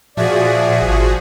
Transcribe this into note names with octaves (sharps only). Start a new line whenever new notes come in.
A#2 F3 F#4 G#4 D5 E5
G#1